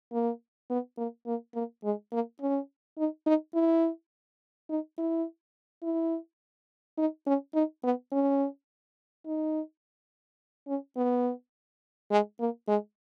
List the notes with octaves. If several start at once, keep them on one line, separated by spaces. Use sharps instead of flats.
A#3
B3
A#3
A#3
A#3
G#3
A#3
C#4
D#4
D#4
E4
D#4
E4
E4
D#4
C#4
D#4
B3
C#4
D#4
C#4
B3
G#3
A#3
G#3